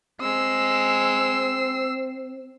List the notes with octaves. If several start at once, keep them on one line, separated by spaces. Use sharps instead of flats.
G#3 C4 E6 C7